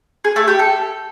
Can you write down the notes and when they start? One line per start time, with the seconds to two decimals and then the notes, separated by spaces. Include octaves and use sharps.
0.24 G#4
0.36 A3
0.48 G4
0.59 A4